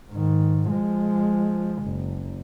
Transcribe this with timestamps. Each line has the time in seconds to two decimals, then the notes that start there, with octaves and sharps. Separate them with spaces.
0.11 G#2 D#3
0.70 F3 G#3
1.83 F#1